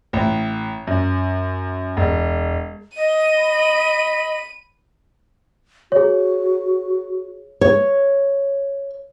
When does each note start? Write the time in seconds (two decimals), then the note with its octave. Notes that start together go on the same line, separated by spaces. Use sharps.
0.13 A1
0.87 F#2
1.97 E1
2.97 D#5 D#7
3.38 B5
5.92 F#4 G#4 C#5
7.61 C#5